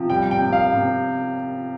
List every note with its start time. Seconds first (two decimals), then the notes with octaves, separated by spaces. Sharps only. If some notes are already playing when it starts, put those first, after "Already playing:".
Already playing: C3 F3
0.10 G3 G5
0.31 G5
0.42 C3
0.53 F5
0.74 C3